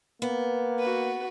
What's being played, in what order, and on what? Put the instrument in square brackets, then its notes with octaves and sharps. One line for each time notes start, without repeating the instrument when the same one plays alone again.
[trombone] A#3 [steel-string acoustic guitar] B3
[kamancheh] F#4 B4